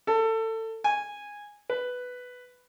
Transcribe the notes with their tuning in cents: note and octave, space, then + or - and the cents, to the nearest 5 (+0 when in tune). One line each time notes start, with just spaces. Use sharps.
A4 +25
G#5 -10
B4 +5